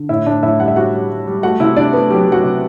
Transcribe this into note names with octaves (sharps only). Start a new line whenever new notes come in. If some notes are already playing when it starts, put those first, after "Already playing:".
Already playing: D3
A2 E4 E5
A2 D4 D5
A2 E4 E5
G3 F#5
E5
G3 F#4 F#5
G3
G3
G3
A3 F#4 F#5
C3 E4 E5
C3 D4 D5
A3 B3 B4
F#3 G4
F#3
F#4 F#5
C3